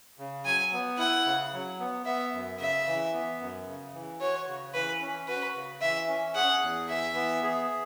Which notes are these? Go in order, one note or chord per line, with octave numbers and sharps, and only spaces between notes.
C#3
F#3 G#5
B3
E4 F#5
C#3
F#3
B3
B3 E5
F#2
C#3 E5
E3
B3
F#2
C#3
E3
F#4 C#5
C#3
E3 B4
C#4
F#4 B4
C#3
E3 E5
C#4
G#4 F#5
E2
E3 E5
B3
G#4